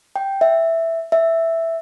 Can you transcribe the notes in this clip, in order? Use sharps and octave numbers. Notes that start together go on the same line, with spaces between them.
G5
E5
E5